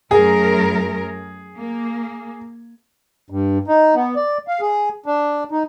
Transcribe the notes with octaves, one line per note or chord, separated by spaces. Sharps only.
F#2 A3 G#4 A#4
A#3
G2
D#4
B3
D5
F5
G#4
D4
D#4